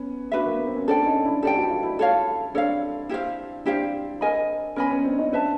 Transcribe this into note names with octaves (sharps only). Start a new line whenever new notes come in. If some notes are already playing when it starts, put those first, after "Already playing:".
Already playing: B3 C#4
D4 F#4 B4 E5
A#3
B3
C4
C#4
C4 D4 A4 D5 G5
C#4 D#4
D4 E4
G4 A4 D5 G5
F#4
F4
E4 F#4
A4 C#5 F5
C4 D4 A4 C#5 F5
E4 G4 C5 F5
C4 D4 E4 G4 C5 F5
A#4 D#5 G#5 B5
B3 C#4 A#4 D#5 G#5 B5
B3 C#4
C4 D4
C#4 D#4
C4 D4 B4 E5 A5